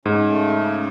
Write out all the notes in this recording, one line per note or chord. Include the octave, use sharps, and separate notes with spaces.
G#2 C#3
A3
C#3